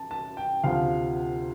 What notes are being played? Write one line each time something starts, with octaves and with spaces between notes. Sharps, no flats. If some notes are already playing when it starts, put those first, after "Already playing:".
Already playing: A5
A5
G5
D2 C3 F3 F5